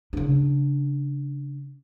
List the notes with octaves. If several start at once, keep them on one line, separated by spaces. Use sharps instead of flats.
C#3 D4